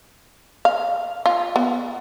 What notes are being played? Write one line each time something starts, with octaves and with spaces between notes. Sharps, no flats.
F5
F4
B3